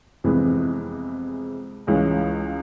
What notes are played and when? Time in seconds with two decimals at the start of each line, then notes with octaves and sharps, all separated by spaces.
0.24 F2 C3 E3 G#3 B3
1.87 C#2 C#3 E3 G#3 C#4